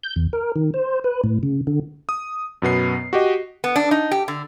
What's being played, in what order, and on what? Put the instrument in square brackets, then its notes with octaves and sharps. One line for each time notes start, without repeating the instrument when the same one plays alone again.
[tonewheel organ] G6
E2
A#4
D#3
C5
B4
A2
C#3
D3
[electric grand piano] D#6
F#2 B2 B3 C7
F#4 G4 D#5
[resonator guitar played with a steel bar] B3
D4
D#4
G4
D3